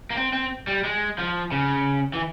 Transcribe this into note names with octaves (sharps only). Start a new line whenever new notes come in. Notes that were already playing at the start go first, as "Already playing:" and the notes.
A#3
C4
C4
G3
G#3
F3
C#3
E3